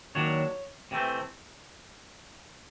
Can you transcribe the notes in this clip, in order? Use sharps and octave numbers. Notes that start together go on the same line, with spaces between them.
D#2 D#3 F#3 D4 C#5
C3 E3 A3 C4